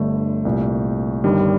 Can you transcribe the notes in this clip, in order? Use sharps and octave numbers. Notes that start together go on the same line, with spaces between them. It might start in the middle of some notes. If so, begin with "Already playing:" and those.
Already playing: G1 G2 D3 A3
C2 A#2
G1 G2 D#3 G3